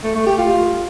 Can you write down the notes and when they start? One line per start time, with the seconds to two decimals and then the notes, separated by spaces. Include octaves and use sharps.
0.04 A3
0.15 A3
0.27 G4
0.38 F4